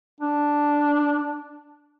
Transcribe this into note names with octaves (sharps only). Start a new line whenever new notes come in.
D4